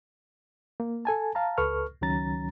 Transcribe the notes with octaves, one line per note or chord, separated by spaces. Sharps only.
A#3
A4 G#5 A5
F5 A5 A#5
C#2 A4 B4 C#6 F6
C#2 D#3 F#3 C#4 A#5 A6